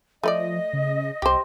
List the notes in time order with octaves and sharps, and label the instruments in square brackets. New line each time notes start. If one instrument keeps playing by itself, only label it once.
[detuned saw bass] F3 [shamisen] A3 B4 D5 [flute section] D#5
[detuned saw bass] C#3
[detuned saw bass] C2 [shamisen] G4 C5